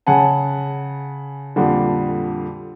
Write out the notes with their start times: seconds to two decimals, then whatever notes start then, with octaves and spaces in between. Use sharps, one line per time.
0.07 C#3 F#5 G#5 A5
1.56 F2 A#2 D3 G3